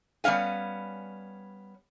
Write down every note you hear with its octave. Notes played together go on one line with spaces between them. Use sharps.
G3 B3 C#4 F5 G#5